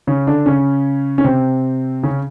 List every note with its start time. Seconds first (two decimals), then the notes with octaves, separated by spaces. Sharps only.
0.07 C#3 C#4
0.27 D3 D4
0.46 C#3 C#4
1.18 C#4
1.24 C3 C4
2.03 C#3 C#4